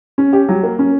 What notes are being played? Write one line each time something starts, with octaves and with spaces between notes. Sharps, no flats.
C#4
G4
F#3
A#3
C#4